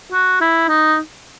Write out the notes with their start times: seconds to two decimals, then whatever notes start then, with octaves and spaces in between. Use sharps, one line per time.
0.12 F#4
0.41 E4
0.68 D#4